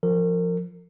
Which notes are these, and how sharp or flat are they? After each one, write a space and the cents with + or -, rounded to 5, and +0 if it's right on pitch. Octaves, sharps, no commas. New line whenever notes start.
F3 +0 A#4 -35